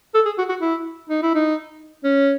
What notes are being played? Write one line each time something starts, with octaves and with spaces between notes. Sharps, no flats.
A4
G#4
F#4
F#4
E4
D#4
E4
D#4
C#4